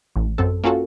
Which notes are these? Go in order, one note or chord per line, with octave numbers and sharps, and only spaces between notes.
A1
F#2 C4 A4
A#3 C#4 F4 F#4 A4